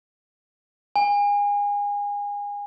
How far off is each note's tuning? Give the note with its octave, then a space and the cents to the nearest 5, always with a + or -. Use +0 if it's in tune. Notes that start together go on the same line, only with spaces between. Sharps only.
G#5 -30